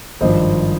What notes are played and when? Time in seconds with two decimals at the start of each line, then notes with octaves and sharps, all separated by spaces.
0.20 G#1 G2 F3 C5 D#5